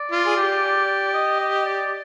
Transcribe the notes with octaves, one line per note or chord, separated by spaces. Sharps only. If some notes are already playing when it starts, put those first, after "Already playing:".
Already playing: D5
F4
G#4
G4
D#5
D#5
D5